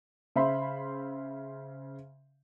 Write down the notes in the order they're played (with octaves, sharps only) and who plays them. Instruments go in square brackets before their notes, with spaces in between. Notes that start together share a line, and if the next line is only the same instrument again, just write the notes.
[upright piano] C#3 C5 E5 B5 C6